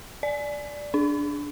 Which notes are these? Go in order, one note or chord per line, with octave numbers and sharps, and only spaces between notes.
D5
D4